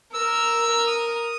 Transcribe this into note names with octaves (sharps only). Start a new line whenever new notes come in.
A#4 E6
D#6